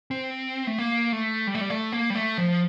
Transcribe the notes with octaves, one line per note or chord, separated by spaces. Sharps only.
C4
A3
A#3
A3
G3
A3
G3
A3
A#3
G3
A3
F3